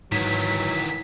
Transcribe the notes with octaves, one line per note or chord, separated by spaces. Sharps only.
G#2 D#3 E3 F#3 B6